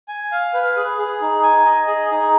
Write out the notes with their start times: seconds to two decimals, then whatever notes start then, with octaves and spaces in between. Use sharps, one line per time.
0.08 G#5
0.32 F5
0.54 B4
0.77 G#4
0.99 G#4
1.21 D#4
1.43 G#5
1.65 D#5
1.87 G#4
2.11 D#4